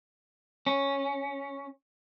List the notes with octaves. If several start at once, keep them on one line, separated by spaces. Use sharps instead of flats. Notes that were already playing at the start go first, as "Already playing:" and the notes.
C#4